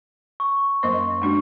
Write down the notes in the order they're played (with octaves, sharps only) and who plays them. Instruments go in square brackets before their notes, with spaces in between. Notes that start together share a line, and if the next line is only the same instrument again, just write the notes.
[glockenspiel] C#6
[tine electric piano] F#2 A#3 C6 [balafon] C5 D#5
[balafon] G#3 D4 F#4